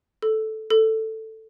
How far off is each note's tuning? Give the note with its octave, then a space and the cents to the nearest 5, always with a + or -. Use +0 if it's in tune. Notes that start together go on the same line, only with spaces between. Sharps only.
A4 -5
A4 +10